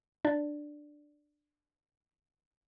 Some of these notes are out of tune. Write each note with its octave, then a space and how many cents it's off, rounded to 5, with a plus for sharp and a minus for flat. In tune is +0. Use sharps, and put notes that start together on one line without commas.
D4 +10 D5 -5